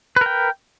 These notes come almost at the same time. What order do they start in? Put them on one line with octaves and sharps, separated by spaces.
B4 A#4 G5